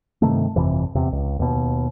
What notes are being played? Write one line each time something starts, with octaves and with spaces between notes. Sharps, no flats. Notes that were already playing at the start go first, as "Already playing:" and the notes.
G2 C3 D#3 A3
G1 F2 C3 E3
D#1 E2 C3
C#2
D#2 B2